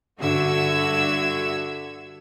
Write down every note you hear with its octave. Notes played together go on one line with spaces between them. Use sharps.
G2 D3 F#4 E5 E6 G#6